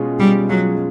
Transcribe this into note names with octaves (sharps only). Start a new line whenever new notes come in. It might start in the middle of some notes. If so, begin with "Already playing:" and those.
Already playing: B2 G#3 C#4 F4 G#4
B2 G3
F#3 G#3 C#4 F4 G#4